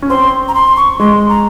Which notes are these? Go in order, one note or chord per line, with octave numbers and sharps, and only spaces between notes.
C#4
C4 C6
A#5
C6
C#6
G#3 C6
A#5